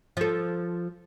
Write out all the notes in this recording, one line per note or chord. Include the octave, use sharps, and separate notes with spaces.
F3 A4